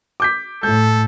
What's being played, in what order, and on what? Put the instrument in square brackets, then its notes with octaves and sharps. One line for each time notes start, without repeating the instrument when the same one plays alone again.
[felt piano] D6 G6 B6
[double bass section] A2 [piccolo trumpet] A4 [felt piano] G6